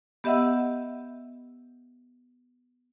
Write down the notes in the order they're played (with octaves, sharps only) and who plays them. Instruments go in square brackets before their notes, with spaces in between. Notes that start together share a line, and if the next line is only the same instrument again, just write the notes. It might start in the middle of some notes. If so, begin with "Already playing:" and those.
[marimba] B3 G4 D#5 E5 F#5 E6